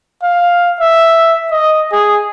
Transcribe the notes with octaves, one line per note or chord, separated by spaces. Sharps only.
F5
E5
D#5
G#4